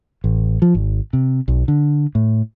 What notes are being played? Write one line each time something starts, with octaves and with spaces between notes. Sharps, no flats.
A1
F3
G#1
C3
B1
D3
A2